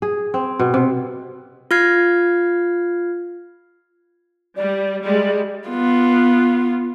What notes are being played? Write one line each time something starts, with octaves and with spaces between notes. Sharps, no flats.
G#4
C4
B2
C3
F4 F6 G#6 C7
G3 D5
G3 G#3 D5
B3 F4